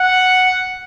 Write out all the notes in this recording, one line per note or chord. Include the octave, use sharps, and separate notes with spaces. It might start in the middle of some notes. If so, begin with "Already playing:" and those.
Already playing: F#5